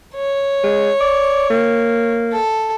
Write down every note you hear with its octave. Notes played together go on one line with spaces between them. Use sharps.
C#5
G#3
D5
A#3
A4